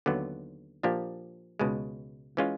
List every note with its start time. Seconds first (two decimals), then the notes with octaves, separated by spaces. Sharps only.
0.06 D#2 D3 F#3 B3
0.83 A#2 F3 A#3 D4 G4
1.59 C#2 B2 G#3
2.37 E3 G#3 C#4 F4